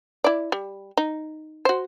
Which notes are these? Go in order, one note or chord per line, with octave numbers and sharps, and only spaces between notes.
E4 D5
G3
D#4
F#4 C5